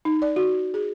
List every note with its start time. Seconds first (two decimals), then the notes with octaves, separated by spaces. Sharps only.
0.05 D#4
0.22 D5
0.36 F#4
0.74 G#4